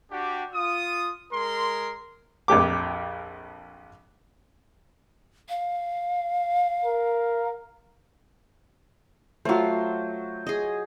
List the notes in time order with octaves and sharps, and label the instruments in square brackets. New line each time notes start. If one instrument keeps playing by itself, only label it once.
[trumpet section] D4 F#4 G4
F4 D#6
G#3 A#4 C6
[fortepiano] A#1 F2 G4 D6
[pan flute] F5
[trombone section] A#4
[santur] F#3 C5 [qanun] A3 F4
[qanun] G#4 D#5